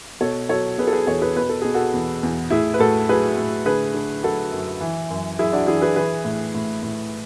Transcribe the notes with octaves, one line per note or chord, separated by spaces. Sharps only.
B2 A4 C#5
F#3 A4 C#5
B2 G#4 B4
A4
G#4 B4
E2 A4 C#5
G#4 B4
B2 B4
A4
B2 G#4
F#4 A4
E2
E2
A2 E4 G#4
B4
A2 F#4 A4
F#3 G#4 B4
A2
D3 G#4 B4
D3
F#3 F#4 A4
F#2
E3
F#2
F#2 E4 G#4
D4 F#4
E3 E4 G#4
G#4 B4
E3 G#4 B4
A2
A2
A2